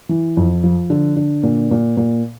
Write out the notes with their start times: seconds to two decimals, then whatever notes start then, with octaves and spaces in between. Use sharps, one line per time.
0.09 E3
0.37 F2
0.64 F3
0.90 D3
1.16 D3
1.43 A#2
1.71 A#2
1.97 A#2